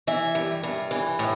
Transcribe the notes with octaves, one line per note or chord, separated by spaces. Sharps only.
E3 E5
G2
G2
E3
A2